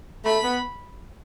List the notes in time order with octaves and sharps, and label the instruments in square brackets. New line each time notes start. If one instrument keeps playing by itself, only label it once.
[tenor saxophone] A3 [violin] B5
[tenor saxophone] B3